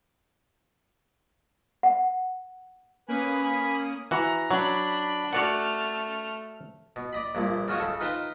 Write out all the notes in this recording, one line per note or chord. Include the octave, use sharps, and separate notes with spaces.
F#5
A#3 C#4 B4 G#5 B5 D#6
G#5 B5
E3 F#4 A#5
F#3 D4 B5
A3 F#4 D5 F#5 F6
B2
D5 D#5 B5
A#1 G2 A#2
C#3 F4 F#4 C#5 D#5
C#3 A4
D#4 F4 B4 C5 G5 A#5